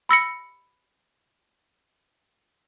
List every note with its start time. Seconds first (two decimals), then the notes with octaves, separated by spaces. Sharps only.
0.09 B5 E6 A#6 C#7